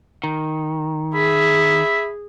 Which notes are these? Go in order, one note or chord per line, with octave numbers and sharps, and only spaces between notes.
D#3
G#4 E5 B5